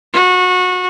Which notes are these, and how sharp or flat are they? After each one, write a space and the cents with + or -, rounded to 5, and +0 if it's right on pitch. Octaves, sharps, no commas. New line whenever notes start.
F#4 -25